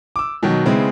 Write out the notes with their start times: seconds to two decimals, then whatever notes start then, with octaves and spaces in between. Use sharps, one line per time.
0.16 D6 E6
0.43 B2 D#3 F#3
0.65 C#3 G#3 B3 C4 E4